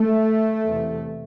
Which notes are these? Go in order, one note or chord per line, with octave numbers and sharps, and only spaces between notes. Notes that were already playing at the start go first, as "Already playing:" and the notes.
Already playing: A3
E2 C3